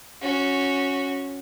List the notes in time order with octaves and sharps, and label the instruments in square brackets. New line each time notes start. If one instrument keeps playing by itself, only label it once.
[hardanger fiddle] C#4 F#4